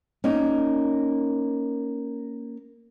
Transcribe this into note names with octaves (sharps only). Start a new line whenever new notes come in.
A#3 C#4 D#4